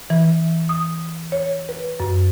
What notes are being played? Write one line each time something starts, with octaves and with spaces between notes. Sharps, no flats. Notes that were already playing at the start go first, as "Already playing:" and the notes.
E3
D#6
C#5
B4
F#2